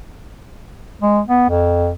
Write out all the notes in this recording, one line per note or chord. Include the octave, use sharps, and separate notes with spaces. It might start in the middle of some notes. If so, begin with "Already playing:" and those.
G#3
B3
F2